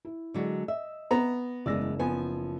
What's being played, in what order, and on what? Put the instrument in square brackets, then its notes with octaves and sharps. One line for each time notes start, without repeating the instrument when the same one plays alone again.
[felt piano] E4
[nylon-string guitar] D3 F#3 G#3
[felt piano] D#5 [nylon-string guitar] E5
[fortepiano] B3 A#5
[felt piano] F#1 E6 A#6 [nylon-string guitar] E2 G#3 D5
[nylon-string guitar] F3 [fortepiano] B3 G#5